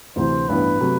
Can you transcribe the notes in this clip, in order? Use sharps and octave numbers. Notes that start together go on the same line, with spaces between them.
D2 C3 E3 C5
A1 G2 E3 B3 B4
C3 F#3 A3